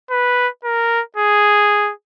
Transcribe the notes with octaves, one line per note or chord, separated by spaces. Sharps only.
B4
A#4
G#4